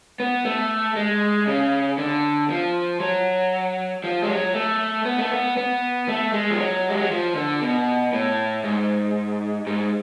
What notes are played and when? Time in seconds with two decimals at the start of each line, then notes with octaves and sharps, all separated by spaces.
0.20 B3
0.45 A3
0.96 G#3
1.47 C#3
1.98 D3
2.50 F3
3.00 F#3
4.04 F3
4.22 G#3
4.28 F#3
4.54 A3
5.05 B3
5.18 A3
5.31 B3
5.57 B3
6.08 A3
6.34 G#3
6.50 F3
6.59 F#3
6.88 G#3
7.00 F#3
7.11 F3
7.36 D3
7.61 B2
8.13 A2
8.64 G#2
9.67 G#2